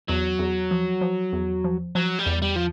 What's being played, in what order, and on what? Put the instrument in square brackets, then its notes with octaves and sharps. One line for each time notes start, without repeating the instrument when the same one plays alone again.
[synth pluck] E2 [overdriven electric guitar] F#3
[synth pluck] E2
F3
F3
E2
F3
[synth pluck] F3 [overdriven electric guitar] F#3
[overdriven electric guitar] G3
[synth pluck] E2
[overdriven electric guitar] G3
F3